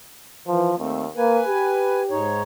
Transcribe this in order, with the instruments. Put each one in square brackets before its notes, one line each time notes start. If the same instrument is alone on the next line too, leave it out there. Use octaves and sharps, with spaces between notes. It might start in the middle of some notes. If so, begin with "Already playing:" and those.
[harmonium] E3 [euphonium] F3
[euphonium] D#2 [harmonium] A3 C4
[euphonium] A#3 [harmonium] B4 G#5
[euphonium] G4
[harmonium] G#2 D#4 C#5